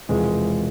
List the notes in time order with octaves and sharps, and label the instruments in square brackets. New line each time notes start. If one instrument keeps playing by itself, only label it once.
[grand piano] E1 E2 C3 F3 [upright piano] G#3